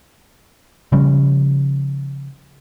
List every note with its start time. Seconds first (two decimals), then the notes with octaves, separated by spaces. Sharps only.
0.92 C#3 F3 G3 C#4